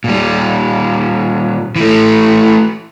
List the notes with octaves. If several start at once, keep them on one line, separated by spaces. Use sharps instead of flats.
A#2 G3
E3 A3